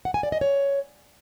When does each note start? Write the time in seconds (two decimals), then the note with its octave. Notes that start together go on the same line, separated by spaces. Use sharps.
0.05 F#5
0.14 G#5
0.23 D5
0.32 D#5
0.41 C#5